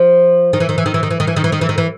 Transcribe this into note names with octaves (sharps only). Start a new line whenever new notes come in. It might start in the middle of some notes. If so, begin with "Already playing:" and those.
Already playing: F3
D#3
E3
D#3
E3
D#3
E3
D#3
E3
D#3
E3
D#3
E3
D#3
E3
D#3
E3